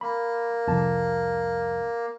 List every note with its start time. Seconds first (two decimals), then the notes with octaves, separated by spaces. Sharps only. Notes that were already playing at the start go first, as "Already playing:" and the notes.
0.01 A#3 B5
0.67 C2 F2 A5